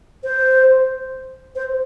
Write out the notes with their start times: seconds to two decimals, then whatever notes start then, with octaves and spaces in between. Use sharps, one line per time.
0.24 C5
1.56 C5